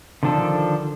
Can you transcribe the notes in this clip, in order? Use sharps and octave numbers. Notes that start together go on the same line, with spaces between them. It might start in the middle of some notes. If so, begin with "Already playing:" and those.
D3 D#3 F3 D4 A4